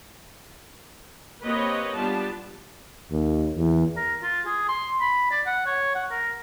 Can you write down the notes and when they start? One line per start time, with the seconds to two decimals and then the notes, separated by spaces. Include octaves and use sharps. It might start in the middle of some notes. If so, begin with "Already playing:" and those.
1.42 A#3 C4 G4 B4 C#5 D#5
1.97 G3 B3 D4 F4 G4 A5
3.12 D#2
3.56 E2
3.96 A#4
4.22 F4
4.46 G#4
4.69 C6
5.01 B5
5.31 D5
5.46 F#5
5.66 C#5
5.95 F#5
6.11 A#4